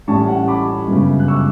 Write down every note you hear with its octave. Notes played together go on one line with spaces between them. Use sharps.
A1 A2 G3 C#4 A5 C#6
F#5
B5 D6
G1 F#2 C#3
F#6
C#6 E6